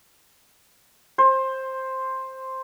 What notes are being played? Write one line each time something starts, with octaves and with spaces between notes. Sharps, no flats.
C5